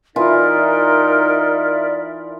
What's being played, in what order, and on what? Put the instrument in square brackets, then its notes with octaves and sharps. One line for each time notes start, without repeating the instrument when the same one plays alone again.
[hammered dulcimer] E3 F4 [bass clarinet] D#4 [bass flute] A#4 [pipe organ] D5 E5